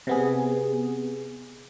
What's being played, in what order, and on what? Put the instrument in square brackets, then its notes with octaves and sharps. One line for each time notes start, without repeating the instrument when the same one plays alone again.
[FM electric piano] C3 B3 G#4